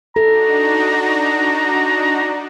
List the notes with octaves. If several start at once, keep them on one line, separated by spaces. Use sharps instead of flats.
D4 D#4 F#4 A4 A#5